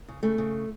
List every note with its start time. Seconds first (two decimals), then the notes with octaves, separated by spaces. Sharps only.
0.08 C#3
0.23 C#3 A3
0.38 C#3